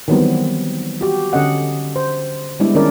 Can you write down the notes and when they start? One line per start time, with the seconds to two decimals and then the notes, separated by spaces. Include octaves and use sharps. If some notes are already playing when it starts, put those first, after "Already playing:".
0.08 D#3 E3 F#3 G3 B3 C4
1.01 F#4 G4
1.33 D3 C#4 D#5 F#5
1.96 C5
2.60 G3 G#3 B3 D4 E4 D5
2.75 D#3 C#4 D4 A#4 D5